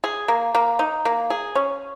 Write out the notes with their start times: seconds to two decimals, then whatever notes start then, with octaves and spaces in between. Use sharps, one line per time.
0.04 G#4
0.28 A#3
0.55 A#3
0.79 D#4
1.05 A#3
1.30 G#4
1.55 C#4